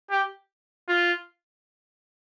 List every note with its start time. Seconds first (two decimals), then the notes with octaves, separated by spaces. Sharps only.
0.11 G4
0.89 F4